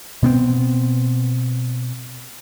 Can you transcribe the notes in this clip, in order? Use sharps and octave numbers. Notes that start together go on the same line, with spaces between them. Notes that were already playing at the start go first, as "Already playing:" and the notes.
B2 B3 C4